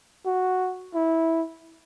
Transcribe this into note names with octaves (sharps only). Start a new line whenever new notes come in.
F#4
E4